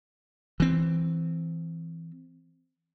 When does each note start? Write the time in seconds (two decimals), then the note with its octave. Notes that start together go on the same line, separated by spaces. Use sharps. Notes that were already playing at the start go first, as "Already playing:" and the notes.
0.60 E3 C4